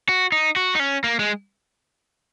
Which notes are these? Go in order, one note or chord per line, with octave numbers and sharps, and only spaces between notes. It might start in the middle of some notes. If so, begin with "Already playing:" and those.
F#4
D#4
F#4
D#4
C#4
A#3
G#3